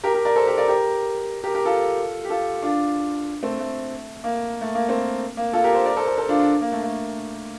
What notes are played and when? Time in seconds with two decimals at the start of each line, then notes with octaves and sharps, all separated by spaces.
0.04 G4 A#4
0.14 G4 A#4
0.25 A#4 D5
0.36 A4 C5
0.47 G4 A#4
0.57 A#4 D5
0.68 G4 A#4
1.44 G4 A#4
1.54 G4 A#4
1.65 F4 A4
2.25 G4
2.30 F4 A4
2.62 D4 F4
3.43 A3 C4
3.59 A3
4.24 A#3
4.61 A3
4.75 A#3
4.88 A3 C4
5.37 A#3
5.53 F4 A4
5.64 G4 A#4
5.75 A4 C5
5.85 A#4 D5
5.97 A4 C5
6.07 A4 C5
6.18 A4 C5
6.29 D4 F4
6.39 D4 F4
6.61 A#3
6.72 A3
6.83 A3